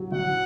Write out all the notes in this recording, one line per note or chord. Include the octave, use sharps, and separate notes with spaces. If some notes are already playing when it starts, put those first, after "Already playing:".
Already playing: F#3
F#3 F#5